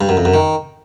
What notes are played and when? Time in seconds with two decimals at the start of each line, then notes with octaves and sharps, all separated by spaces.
0.01 G2
0.09 F#2
0.17 F2
0.25 F#2
0.34 D#3